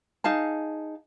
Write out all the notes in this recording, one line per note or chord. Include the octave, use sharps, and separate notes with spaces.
D#4 G#4 F5 A5